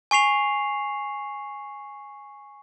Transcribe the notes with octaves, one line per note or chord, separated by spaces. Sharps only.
G#5 C#6 C7 F7